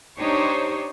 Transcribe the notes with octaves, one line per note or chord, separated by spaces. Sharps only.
D4 D#4 G4 C5 C#5